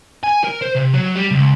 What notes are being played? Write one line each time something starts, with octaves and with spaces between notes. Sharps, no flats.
G#5
A#4
C5
C3
F#3
G3
C#2